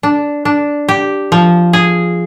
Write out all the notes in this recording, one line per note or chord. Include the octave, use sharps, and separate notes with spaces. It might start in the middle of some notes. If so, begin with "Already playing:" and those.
D4
D4
G4
F3
G#4